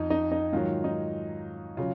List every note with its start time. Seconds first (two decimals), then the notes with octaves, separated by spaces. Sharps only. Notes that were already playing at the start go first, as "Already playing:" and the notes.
Already playing: F2 F3 D#4 F4
0.10 D#4
0.32 D#4
0.53 G#2 D#3 F#3 F4
0.84 D#4
1.77 C#3 F#3 F4